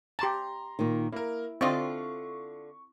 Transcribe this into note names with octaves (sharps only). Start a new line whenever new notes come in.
G4 A5 A#5 C6
A#2 D#3
A#3 E4 A#4
D3 C4 F4 D5 D#5 C#6